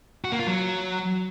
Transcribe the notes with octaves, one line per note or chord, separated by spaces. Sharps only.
F#4
A#3
F4
F#3